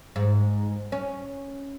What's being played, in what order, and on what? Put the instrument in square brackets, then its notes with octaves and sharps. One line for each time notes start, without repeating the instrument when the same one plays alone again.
[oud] G#2
C#4